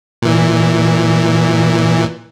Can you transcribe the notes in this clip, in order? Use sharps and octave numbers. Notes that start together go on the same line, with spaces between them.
A#2 E3